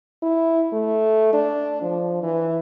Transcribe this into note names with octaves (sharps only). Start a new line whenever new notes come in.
E4
A3
D4
F3
E3